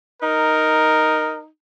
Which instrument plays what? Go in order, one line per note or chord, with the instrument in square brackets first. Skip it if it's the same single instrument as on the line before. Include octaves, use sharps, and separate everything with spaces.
[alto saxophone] D#4 [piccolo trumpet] A#4